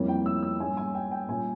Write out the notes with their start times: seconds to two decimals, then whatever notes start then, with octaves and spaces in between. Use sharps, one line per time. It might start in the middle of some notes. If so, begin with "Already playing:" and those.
Already playing: F2 E3 G3 A#3 C#4
0.08 G5
0.26 E6
0.43 E6
0.60 G#2 G3 A#3 C#4 G#5
0.77 G#5
0.94 G5
1.11 G5
1.28 A#2 G3 A#3 C#4 G#5